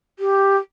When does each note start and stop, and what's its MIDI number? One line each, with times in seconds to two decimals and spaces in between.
0.19 0.57 67